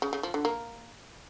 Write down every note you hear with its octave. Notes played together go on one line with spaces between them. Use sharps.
C#3
C#3
F3
D3
A#3